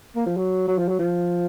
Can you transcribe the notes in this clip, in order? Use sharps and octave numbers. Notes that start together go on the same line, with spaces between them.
A#3
F3
F#3
F#3
F3
F#3
F3